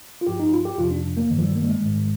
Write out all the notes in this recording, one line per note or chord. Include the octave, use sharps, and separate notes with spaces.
F4
G2 F3 G4
D#4
F4
G4
F2 C3 F3 F4
D4
A#3
G2 D#3
F3
G3
A#3
G3
G#3
G#2 D#3